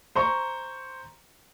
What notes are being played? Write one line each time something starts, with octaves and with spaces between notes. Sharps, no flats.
C5 A#5 C#6